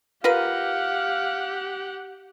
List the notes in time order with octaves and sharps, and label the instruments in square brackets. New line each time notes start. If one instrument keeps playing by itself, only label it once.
[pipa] F4 A#4 B4 [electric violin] G4 F#5 [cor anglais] F5